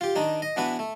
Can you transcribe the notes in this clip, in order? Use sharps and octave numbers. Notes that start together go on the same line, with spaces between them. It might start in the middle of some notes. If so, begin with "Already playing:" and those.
F4 G4
D#3 D4 D#4
D#5
E3 B3 D4 F#4 B4
A3